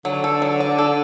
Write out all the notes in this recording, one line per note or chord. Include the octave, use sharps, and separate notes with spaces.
D3 F#3
A4
F#3
D5
A4